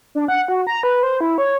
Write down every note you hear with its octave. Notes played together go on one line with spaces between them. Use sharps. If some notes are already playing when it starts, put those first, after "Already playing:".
D4
F#5
F#4
A#5
B4
C5
E4
C#5